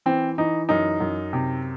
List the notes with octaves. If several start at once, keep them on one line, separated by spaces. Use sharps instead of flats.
E3 C4
E3 D#4
F#2 D#4
F#2
C3